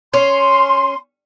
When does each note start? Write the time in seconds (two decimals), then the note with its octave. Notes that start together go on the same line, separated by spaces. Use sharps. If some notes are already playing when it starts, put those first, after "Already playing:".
0.14 C#4 C6